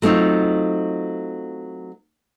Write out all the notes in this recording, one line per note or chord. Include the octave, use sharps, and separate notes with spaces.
F#3 A3 C4 D#4 F4